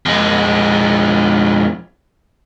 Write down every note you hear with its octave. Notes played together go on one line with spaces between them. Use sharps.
F2 G#3